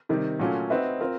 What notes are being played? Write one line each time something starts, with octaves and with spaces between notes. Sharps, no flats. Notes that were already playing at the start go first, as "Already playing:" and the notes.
C3 D#3 G3
A#2 F#3 A3 C#4 F4
C4 D#4 F#4 B4 E5
C4 F4 A#4